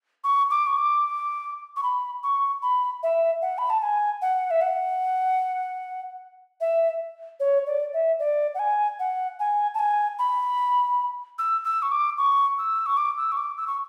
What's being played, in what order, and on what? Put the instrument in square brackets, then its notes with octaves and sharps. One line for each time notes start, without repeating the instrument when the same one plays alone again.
[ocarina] C#6
D6
C#6
D6
C#6
B5
C#6
B5
E5
F#5
B5
A5
G#5
F#5
E5
F#5
E5
C#5
D5
E5
D5
F#5
G#5
F#5
G#5
A5
G#5
B5
E6
E6
C#6
D6
C#6
E6
C#6
D6
E6
C#6
D6
E6
C#6